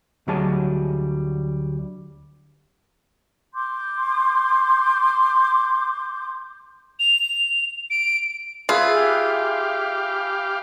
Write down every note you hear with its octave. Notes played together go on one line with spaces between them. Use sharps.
D2 F#3 G3 G#4 D#5 A5
C6 D6 G6
F7
D7
F4 G#4 B4 E5
G4 F5